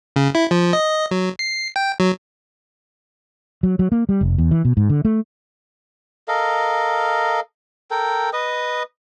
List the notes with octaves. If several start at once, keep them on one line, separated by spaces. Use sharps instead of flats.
C#3
E4
F3
D#5
F#3
C7
G5
F#3
F#3
F#3
A#3
G3
F1
E2
E3
B2
G#2
D3
A3
A4 A#4 D#5 F5
A4 A#4 G5
B4 D#5 D#6